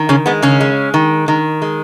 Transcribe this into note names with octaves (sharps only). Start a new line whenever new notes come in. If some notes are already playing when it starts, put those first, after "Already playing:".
Already playing: D#3
C#3 C#4
G#3 B3
C#3 C#4
G#3
D#3
D#3
G#3